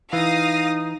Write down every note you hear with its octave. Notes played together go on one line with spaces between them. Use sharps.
E3 D#4 F5 D#6 A#6